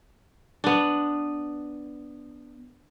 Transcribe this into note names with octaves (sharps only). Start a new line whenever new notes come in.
B3 D4